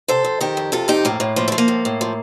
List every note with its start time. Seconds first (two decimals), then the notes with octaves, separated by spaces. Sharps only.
0.08 C3 A4 C5
0.25 F2
0.41 D#3 G4 A#4
0.57 F2
0.72 C3 F4 A4
0.88 F2 D#4 G4
1.05 A2 A#3
1.20 A2
1.36 F3 A#3
1.48 F3 A3
1.58 A#3
1.68 A2
1.85 A2
2.01 F3